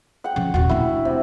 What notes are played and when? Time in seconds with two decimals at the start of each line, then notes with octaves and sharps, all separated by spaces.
0.24 F#5 G5
0.36 C#3 F3
0.54 D#1 A1 F#4
0.69 A3 D4 E4
1.05 C3